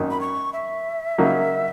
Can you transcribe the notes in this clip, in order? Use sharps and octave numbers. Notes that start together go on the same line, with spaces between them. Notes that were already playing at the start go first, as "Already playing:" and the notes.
Already playing: G#1 F#2 D#3 A#3 D#4
B5
C#6
E5
C#3 F#3 A#3 D#4